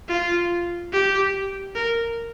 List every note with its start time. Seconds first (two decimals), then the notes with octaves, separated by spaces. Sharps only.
0.08 F4
0.92 G4
1.75 A#4